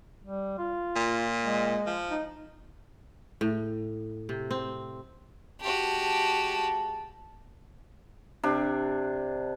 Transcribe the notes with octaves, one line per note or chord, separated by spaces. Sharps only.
G3
F4
A#2
G#3
F3
D#4
A2
C3
C4
G#3 F#4 G4 A5
C3 D4